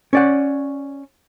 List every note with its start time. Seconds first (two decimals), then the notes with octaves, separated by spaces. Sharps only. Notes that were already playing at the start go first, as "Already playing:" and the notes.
0.13 C#4 D5 F#5